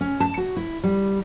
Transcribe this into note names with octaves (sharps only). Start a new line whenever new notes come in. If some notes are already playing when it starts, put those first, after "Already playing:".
C#4
A5
F#4
E4
G3